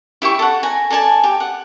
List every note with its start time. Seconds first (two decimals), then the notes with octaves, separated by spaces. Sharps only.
0.22 E4 G4 G5 C#6
0.39 A4 F#5
0.63 G#5 A#5
0.90 A4 D5 G#5 A5
1.24 G4
1.40 F#5